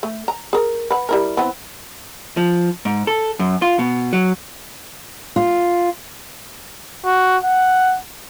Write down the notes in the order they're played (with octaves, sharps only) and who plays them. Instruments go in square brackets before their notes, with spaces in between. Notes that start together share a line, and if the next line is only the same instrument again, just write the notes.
[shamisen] A3
A#5
G#4 A#4
B4 F#5
G3 E4 A#4
E3 B3 C4
[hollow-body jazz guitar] F3
G#2
A4
F#2
F4
B2
F#3
[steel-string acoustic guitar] F4
[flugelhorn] F#4
F#5